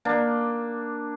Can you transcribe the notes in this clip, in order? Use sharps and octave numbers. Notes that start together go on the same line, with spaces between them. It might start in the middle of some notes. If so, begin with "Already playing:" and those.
A#3 D4